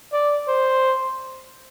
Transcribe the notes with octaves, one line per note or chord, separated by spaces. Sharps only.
D5
C5